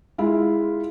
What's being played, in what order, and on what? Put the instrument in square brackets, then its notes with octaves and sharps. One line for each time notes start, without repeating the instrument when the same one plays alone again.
[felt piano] G#3 E4 F4